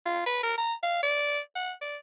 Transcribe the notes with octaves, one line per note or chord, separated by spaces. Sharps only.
F4
B4
A#4
A#5
F5
D5
F#5
D5